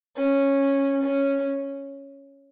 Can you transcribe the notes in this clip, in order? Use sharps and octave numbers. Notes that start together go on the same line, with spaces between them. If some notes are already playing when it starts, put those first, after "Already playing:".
C#4
C#4